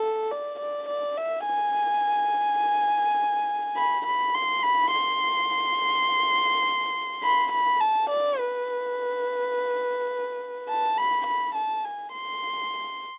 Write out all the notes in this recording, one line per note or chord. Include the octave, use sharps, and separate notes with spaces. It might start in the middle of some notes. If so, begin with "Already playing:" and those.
Already playing: A4
D5
D5
D5
E5
G#5
B5
B5
C6
B5
C6
B5
B5
A5
D5
B4
A5
B5
B5
A5
G#5
C6